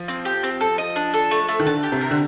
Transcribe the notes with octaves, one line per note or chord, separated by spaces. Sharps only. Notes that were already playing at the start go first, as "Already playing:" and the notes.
Already playing: F3
C4
G4
C4
A4
D#5
D4
A4
A3
A3
D#3
D3 A5
G4
C3
A#4
D3